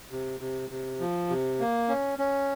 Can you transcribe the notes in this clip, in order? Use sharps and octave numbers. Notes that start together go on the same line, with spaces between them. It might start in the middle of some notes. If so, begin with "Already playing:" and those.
C3
C3
C3
F3
C3
A#3
C#4
C#4